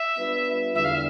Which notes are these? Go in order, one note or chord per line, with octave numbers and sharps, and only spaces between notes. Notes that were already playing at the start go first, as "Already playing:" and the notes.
Already playing: E5
G3 B3 D4 F4 B4
E2 D3 G3 E5
F5
E5